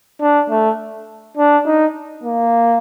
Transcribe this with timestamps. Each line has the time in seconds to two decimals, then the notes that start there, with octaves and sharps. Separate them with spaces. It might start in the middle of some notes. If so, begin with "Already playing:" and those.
0.22 D4
0.50 A3
1.38 D4
1.66 D#4
2.24 A#3